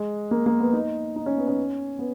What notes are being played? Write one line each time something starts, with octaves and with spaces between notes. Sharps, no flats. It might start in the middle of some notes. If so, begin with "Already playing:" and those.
Already playing: G#3
A#3
A#3
B3
D#4
D#4
C#4
B3
C#4
B3